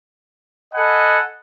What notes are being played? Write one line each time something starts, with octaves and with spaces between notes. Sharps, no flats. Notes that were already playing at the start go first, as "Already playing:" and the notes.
A4 D#5 F#5 G#5 B5